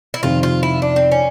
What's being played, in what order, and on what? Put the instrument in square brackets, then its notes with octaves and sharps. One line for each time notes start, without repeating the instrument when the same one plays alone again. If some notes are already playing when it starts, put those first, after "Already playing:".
[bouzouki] E4
[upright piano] F2 C3 D#3 [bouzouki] F4
[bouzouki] F4
E4
D4
C4
C#4